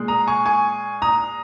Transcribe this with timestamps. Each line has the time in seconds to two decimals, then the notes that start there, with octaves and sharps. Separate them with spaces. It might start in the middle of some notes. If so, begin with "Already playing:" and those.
Already playing: A#2 G#3
0.08 A#5 D#6
0.27 G#5 C#6
0.46 G#5 C#6
1.02 A#5 D#6